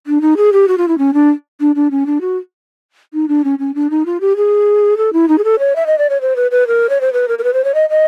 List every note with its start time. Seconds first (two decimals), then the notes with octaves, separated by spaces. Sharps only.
0.07 D4
0.21 D#4
0.37 G#4
0.53 G4
0.68 F#4
0.78 F4
0.88 E4
0.98 C#4
1.14 D4
1.60 D4
1.75 D4
1.91 C#4
2.06 D4
2.21 F#4
3.14 D#4
3.28 D4
3.44 C#4
3.59 C#4
3.75 D4
3.90 D#4
4.06 F4
4.21 G4
4.36 G#4
4.97 A4
5.13 E4
5.28 D#4
5.38 G#4
5.44 A4
5.59 C#5
5.76 E5
5.86 D#5
5.98 D5
6.09 C#5
6.21 C5
6.36 B4
6.51 B4
6.67 A#4
6.89 C#5
7.01 C5
7.13 B4
7.28 A#4
7.38 A#4
7.44 B4
7.53 C5
7.64 C#5
7.74 D#5
7.90 D#5